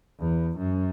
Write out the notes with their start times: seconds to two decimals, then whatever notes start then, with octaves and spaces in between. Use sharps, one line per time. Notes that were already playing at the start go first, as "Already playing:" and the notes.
0.20 E2
0.58 F#2